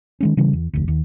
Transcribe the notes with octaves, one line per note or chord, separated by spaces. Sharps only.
D#3 G#3 C#4
C#3 E3 G3
E2
F1 D2
D#2